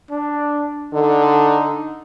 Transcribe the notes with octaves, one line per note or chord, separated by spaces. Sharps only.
D4
D3 D#4